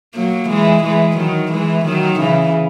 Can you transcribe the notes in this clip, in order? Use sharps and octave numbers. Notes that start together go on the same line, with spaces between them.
F#3 A#3
E3 G#3
E3 G#3
D#3 F#3
E3 G#3
D#3 F#3
C#3 E3